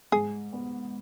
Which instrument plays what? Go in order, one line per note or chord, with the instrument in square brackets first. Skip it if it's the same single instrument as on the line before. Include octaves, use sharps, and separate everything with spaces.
[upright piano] G#2 [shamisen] G#4
[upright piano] B3